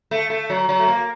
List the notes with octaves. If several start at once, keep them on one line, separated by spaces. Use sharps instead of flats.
A3
A3
F#3
F#3
A3
A#3